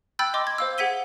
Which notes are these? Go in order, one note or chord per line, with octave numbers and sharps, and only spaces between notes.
G5 B5 E6 F#6 G6 A6
D#5 C6 D6
G#6
C5 F5 E6
G#4 F#5 G#6 B6 D#7 G7